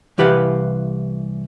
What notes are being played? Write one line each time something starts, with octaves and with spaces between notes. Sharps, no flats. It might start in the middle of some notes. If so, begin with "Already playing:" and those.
C2 E3 G4 B4 F5 F#5